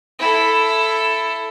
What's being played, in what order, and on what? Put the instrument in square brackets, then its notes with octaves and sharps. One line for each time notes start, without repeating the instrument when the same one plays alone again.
[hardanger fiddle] E4 A4